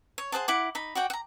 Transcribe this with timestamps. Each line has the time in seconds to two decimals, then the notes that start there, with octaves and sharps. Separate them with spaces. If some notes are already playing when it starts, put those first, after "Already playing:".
0.18 C#5
0.32 G#4 C5 F#5 A5
0.48 E4 F#5 D6
0.75 D#4 B5
0.95 F#4 D5 F#5 G5
1.10 F#5 A#5